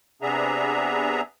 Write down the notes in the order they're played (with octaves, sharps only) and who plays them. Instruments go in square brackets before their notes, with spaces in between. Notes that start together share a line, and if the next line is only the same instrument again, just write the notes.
[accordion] C3 B3 D4 G#4 E5 A#5